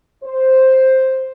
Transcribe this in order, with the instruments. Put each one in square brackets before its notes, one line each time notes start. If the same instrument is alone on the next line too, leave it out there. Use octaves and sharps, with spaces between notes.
[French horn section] C5